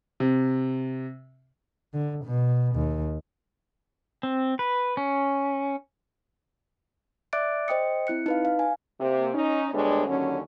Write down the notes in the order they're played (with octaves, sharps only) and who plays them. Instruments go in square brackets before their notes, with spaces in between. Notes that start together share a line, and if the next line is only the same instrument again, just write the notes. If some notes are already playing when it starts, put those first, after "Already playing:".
[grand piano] C3
[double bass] D3
B2
D#2
[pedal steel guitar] C4
B4
C#4
[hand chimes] D5 E5 D6 F#6 A6 D7
C5 D#5 G5 D#6 C#7
C4 E4 F#6 C#7
D#4 B4 F5
F5
G#5
[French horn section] C3 A#3
C#4 D#4
D2 G3 G#3 B3 D4 C#5
D#2 D3 F#3 C#4